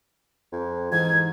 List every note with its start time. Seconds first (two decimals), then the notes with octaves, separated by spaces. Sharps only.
0.52 F2
0.92 G#2 E3 G#6